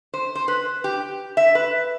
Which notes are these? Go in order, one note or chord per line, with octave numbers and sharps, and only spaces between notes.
C5
C5
B4
G4
E5
B4